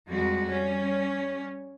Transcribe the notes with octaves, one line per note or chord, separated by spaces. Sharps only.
F2 G3 G#3 F#4
G3 C#4